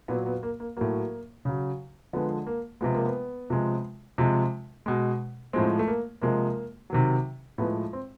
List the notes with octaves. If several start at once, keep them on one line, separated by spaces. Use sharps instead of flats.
A#2 F#3 B3
B3
A#3
A#3
A2 F#3 A#3
C#3 F#3
D3 F3 G#3 B3
A#3
C3 F3 G#3 B3
A#3
B3
C3 F3 G#3
C3 F3 G#3
B2 G#3
A2 F3 G#3 C4
A3
A#3
C3 F3 G#3 A#3
C3 D#3 F#3
A2 F3 G#3 B3
C4